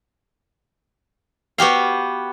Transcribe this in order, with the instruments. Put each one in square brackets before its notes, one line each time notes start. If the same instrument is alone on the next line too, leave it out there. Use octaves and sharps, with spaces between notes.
[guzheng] B3 F#4 G4 F5